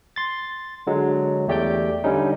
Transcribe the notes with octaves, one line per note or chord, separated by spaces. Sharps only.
C6 A6
D3 F#3 G#3
E2 A3 G4 D5 G5 G6
D3 G3 C#4 D#4